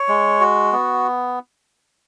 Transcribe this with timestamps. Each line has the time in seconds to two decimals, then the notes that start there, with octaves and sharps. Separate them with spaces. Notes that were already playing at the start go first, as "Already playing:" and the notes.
Already playing: C#5
0.08 G#3
0.41 F#4
0.72 B3